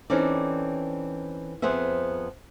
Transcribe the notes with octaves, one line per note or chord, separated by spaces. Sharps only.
E3 C4 C#4 D#4 A4 D5
F2 B3 G#4 C5 E5